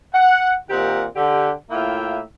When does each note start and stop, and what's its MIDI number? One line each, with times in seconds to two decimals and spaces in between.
0.13 0.52 78
0.69 1.04 46
0.69 1.04 51
0.69 1.04 60
0.69 1.04 67
0.69 1.04 70
0.69 1.04 78
1.16 1.50 50
1.16 1.50 67
1.70 2.19 45
1.70 2.19 58
1.70 2.19 64
1.70 2.19 65
1.70 2.19 76
1.70 2.19 79